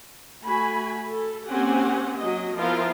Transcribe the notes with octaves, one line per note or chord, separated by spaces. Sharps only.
A3 F#4 G#5 B5
A4
A#3 C4 C#4 G4 F#5 G#5
F#3 D#5
F3 B3 E4 F4 A#4 F5